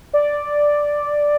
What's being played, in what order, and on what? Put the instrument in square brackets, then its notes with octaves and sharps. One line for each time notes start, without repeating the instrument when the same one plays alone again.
[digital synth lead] D5